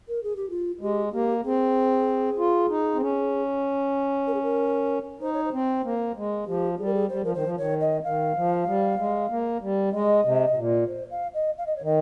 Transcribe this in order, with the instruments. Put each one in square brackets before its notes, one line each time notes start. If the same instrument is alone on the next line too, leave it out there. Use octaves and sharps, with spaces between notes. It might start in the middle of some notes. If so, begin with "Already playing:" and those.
[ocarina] A#4
G#4
G4
F4
[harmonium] G#3 [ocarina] G4
[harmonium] A#3 [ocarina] G4
[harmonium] C4 [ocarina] G#4
[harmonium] F4
D#4
C4
C#4
[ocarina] A#4
G#4
A#4
[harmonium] D#4 [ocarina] C5
[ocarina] C#5
C5
[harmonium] C4
A#3
G#3
[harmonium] F3 [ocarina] G4
[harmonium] G3 [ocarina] G#4
[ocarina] A#4
G#4
[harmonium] G3 [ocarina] C5
[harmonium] F3 [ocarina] A#4
[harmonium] D#3 [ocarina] C5
[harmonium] F3
[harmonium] D#3 [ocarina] C#5
[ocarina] D#5
[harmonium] D#3 [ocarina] F5
[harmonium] F3
G3
G#3
A#3
G3
[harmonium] G#3 [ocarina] D#5
[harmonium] C3
C3
A#2
[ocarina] C5
F5
D#5
F5
D#5
C#5
[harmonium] D#3 [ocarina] D#5